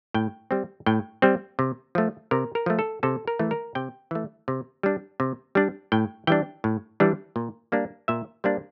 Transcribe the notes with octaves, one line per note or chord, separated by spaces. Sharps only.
A2 G5
G3 C4
A2 G5
G3 C4
C3
F3 A3
C3 A#4
A#4
F3 A3
A4
C3 A4
A#4
E3 A3
A#4
C3 G5
E3 A3
C3
G3 D4
C3
G3 D4
A2 G5
E3 G3 D4 G5
A2
E3 G3 D4
A#2
G3 A#3 D4
A#2 E5
G3 A#3 D4 C5